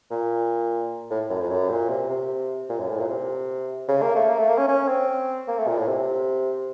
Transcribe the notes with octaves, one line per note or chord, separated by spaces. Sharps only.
A#2
A2
F#2
F2
F#2
A#2
C3
C3
A#2
F#2
A2
A#2
C3
C#3
A#3
A3
A#3
A3
A#3
C#4
C#4
C4
A#3
A3
A#2
A2
C3